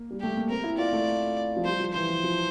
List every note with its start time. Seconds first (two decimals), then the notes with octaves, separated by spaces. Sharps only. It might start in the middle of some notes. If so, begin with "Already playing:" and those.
Already playing: A#3
0.11 G3
0.20 A3 G4
0.37 A#3
0.50 C4 A#4
0.64 E4
0.78 F4 D5
0.93 A3
1.56 F3
1.65 G3 C5
1.80 F3
1.94 E3 C5
2.09 F3
2.23 F3